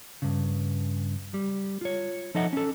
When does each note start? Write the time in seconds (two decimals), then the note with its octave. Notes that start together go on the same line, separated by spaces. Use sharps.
0.22 G2 C#3
1.34 G3
1.81 F4 C#5
2.35 F3 D#4 A4 D#5 E5 F#5
2.53 C#4 A4